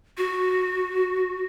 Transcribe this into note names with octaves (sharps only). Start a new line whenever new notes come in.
F#4